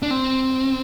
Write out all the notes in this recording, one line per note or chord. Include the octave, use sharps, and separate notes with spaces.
D4
C4